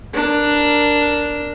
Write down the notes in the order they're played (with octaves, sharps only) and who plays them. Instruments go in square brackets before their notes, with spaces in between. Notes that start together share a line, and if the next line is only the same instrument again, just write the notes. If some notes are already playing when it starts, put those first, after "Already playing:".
[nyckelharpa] D4 A#4